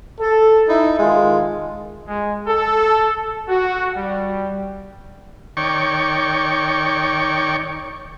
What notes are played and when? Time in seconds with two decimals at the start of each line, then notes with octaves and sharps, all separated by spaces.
0.20 A4
0.69 D#4 E4
0.99 D#3 G#3 F4 G#4
2.07 G#3
2.47 A4
3.48 F#4
3.95 G3
5.57 D#3 C#5 D5 G5 C#6